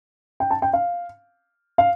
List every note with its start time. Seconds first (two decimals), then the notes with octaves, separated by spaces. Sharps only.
0.40 G5
0.51 A5
0.62 G5
0.73 F5
1.78 F5